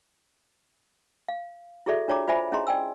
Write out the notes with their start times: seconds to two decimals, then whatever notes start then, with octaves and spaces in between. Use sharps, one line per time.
1.28 F5
1.86 E4 F#4 G#4 A4 D5 E5
2.08 D4 F4 C#5 D5 A#5 D6
2.27 F4 C5 D5 E5 G#5 B5
2.52 C#4 E4 G#4 D#5 A#5 C6
2.67 D5 G5 G#5 E6